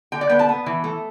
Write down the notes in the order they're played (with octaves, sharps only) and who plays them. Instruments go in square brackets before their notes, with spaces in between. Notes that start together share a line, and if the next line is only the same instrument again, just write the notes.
[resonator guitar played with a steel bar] D3 G5
D5
B3 G5
A5
B3
E3
A3